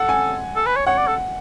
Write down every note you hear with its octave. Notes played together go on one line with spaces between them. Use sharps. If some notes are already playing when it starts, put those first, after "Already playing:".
Already playing: A4 F#5
G#5
A4
B4
C#5
C#5 F#5
D5
A4